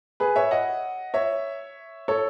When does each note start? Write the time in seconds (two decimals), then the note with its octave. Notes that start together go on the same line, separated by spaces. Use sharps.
0.20 G#4 B4
0.36 C#5 E5
0.51 D#5 F#5
1.14 C#5 E5
2.08 A4 C#5